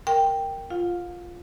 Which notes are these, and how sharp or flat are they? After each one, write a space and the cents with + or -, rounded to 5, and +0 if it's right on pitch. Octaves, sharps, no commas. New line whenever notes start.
A#4 -5 G5 +0
F4 +0 F5 +35